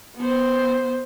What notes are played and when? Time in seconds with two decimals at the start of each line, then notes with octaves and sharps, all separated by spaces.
0.16 B3 C5